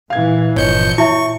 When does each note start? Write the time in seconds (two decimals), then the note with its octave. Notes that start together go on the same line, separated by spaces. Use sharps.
0.10 A#2 E3 F5 G#6
0.56 G1 A#2 F3 C#5 D#5 G6 C#7
0.98 E4 C#5 E5 A5 C#6